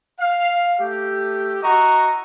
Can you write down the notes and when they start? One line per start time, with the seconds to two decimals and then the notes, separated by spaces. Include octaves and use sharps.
0.20 F5
0.79 A3 G4
1.63 E4 F#4 D#5 A#5 C#6